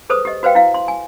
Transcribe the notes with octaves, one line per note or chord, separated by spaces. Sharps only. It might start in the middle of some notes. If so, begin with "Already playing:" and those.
G#4 A4 B4 C5 D#6
G4 D#5
F#4 B4 C5 F5 G5
E4 F5
C6
G#5